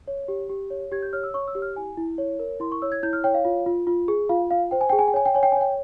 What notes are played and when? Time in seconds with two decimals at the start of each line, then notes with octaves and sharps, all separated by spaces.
0.08 C#5
0.28 G4
0.49 G4
0.71 C#5
0.92 G4 G#6
1.02 G6
1.13 C#5 F6
1.23 E6
1.34 C#5 C#6
1.48 E6
1.55 G4
1.62 F6
1.76 E4 G#5
1.97 E4
2.18 C#5
2.39 A#4
2.60 E4 C6
2.72 C#6
2.82 C#5 E6
2.92 G#6
3.03 E4 G6
3.13 F6
3.24 C#5 G5
3.34 F5
3.45 F4
3.66 F4
3.87 F4
4.08 G#4
4.29 F4 F5
4.51 F4 F5
4.71 C5 G5
4.81 G#5
4.90 G#4 G5
4.99 G#5
5.08 G5
5.14 C#5 G#5
5.25 G5
5.34 C#5 G#5
5.43 G5
5.52 G#5
5.56 C#5 G5